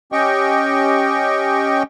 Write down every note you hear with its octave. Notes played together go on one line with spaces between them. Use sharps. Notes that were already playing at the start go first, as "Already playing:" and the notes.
C#4 G4 D#5 G5 C#6